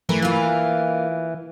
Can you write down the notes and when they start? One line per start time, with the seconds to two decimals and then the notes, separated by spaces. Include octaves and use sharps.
0.09 E3 A3 E4 A#4
0.22 A#3 F4